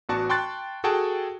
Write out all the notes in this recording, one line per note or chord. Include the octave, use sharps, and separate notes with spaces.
A1 B3 F#4 D5 A5 C#6
G5 A5 C6 C#6 F#6 A6
F#4 G#4 A4 G5 A5